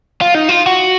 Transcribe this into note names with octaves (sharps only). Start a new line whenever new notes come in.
F4
D#4
F4
F#4